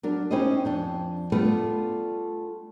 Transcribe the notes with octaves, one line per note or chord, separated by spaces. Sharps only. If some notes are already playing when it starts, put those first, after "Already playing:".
F#3 D4 A#4
C#4 D#4 E4 G4 C5 D#5
F2 D4 G5
G3 A3 B3 D4 F4 B4